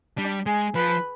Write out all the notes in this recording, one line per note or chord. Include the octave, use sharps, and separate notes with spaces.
G3 D4
G#3 G#4
F3 B4